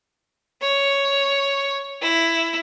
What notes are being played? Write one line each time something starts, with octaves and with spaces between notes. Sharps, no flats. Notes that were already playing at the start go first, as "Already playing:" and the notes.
C#5
E4